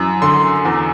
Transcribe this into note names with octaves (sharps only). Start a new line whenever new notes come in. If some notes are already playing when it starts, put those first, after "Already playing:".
Already playing: F#2 E3
D3 C6
E2